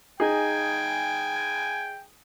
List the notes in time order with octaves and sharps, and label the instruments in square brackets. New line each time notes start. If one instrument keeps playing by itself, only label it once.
[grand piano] D#4 G#4 [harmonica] G5 G#5